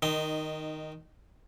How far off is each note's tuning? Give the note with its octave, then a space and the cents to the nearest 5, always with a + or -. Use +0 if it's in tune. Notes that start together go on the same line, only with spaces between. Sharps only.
D#3 +0 D#4 -15 C6 +0